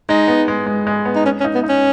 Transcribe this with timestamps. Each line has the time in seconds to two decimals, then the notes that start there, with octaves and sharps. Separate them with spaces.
0.09 G#3 D#4
0.28 B3
0.48 G#3
0.66 G#3
0.87 G#3
1.05 B3
1.15 D#4
1.25 C#4
1.40 C#4
1.44 D#4
1.55 B3
1.64 D#4
1.69 C#4